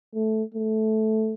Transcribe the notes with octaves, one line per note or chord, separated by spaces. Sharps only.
A3
A3